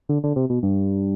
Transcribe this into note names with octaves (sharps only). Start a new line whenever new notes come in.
D3
D3
C3
B2
G2